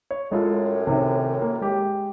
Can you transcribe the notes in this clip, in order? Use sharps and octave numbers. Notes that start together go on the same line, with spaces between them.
C#5
F#2 A2 G#3 F4 A4
C3 D#3
A#3
G#3 G4